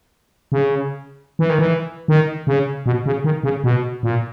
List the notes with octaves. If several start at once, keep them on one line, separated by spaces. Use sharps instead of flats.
C#3
E3
D#3
E3
D#3
C#3
B2
C#3
D#3
C#3
B2
A#2